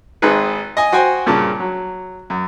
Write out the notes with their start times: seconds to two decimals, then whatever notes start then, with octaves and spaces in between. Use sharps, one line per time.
0.22 G#1 C4 D#4 G#4 B4
0.77 D#5 G#5
0.92 F#4 C5 G5 G#5
1.26 G2 A#2 C#3 A5
1.60 F#3
2.30 F#2